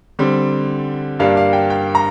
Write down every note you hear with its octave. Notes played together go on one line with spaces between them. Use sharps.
D3 G3 C4
G2 G3 A#3 D4 F5
F5
G5
G5
A#5